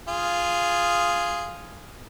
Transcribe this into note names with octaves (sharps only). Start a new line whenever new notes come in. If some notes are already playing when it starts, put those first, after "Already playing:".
F4 G#4